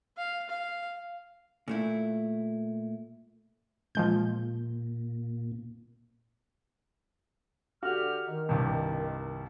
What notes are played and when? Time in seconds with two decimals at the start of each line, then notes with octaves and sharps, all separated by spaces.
0.18 F5
0.49 F5
1.68 A#2 A3 E4
3.95 A#2 F3 G#3 G6
7.83 D3 F#4 G4 F6
8.26 D#3
8.49 C2 G2